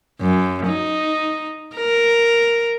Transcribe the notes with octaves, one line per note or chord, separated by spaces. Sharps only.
F#2
D#4
A#4